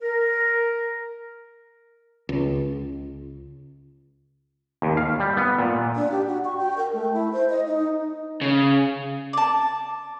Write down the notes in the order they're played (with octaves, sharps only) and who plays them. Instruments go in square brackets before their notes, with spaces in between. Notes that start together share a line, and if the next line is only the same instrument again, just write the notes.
[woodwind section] A#4
[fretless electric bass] C#2
[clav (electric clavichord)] D#2
F5
G3
B3
A#2
[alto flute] D4
G4
F#4
C#6
G5
A#4
A3
E4
C5
D#5
D#4
[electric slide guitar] C#3
[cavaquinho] D5 A5